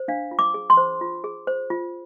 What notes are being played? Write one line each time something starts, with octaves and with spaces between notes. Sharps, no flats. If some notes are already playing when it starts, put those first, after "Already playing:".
Already playing: C5
D4 F5
F4
D6
G#4
C6
C5
F4
G#4
C5
F4